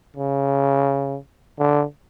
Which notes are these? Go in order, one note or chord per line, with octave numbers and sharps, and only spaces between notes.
C#3
D3